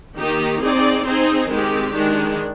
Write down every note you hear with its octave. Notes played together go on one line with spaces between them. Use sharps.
D#3 A#3 D#4 G4
C4 D#4 G#4 D5
C4 D#4 G#4 C5
D#3 G#3 C4 G4
D#3 G#3 D4